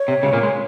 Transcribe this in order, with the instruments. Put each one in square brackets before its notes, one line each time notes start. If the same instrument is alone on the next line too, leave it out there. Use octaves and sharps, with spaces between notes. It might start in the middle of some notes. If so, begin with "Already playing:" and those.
Already playing: [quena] C#5
[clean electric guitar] C3
C#2 C#3
A#2 A#3
G#3